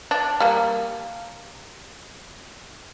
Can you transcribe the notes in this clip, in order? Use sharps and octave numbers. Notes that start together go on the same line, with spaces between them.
D4
G3 A#3